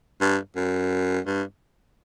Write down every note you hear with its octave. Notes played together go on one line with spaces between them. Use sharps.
G2
F#2
G2